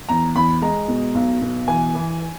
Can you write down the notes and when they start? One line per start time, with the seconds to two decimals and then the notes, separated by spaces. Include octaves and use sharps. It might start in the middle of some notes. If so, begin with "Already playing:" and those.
0.09 E2 A#5
0.35 E2 B5
0.62 G#3 A#5
0.88 B2
1.15 B1
1.41 B2
1.68 E3 G#5
1.95 E3